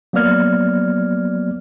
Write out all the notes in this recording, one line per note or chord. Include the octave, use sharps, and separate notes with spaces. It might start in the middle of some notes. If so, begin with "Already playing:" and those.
F#3 A#3 B3 D5 F6 G#6